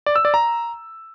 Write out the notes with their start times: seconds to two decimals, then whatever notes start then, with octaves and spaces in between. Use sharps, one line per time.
0.06 D5
0.16 E6
0.25 D5
0.34 A#5